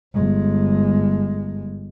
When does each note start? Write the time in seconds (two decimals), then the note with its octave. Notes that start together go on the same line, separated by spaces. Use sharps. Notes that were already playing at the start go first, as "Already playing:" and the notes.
0.14 G1 G#3